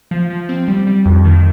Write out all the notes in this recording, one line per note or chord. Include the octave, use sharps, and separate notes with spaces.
F3
F3
C4
G3
G3
F2
D#3